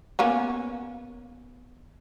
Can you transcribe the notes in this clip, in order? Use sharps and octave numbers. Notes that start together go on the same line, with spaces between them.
A#3 B3 C#4